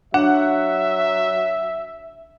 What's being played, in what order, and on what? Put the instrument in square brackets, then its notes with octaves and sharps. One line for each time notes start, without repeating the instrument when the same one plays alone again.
[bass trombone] F#3 [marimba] D4 [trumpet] E5 [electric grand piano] F#5